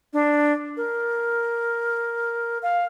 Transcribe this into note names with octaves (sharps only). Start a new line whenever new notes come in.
D4
A#4
F5